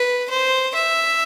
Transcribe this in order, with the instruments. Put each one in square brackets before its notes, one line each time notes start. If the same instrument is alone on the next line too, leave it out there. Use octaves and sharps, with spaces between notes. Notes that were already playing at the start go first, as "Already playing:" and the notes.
Already playing: [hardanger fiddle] B4
C5
E5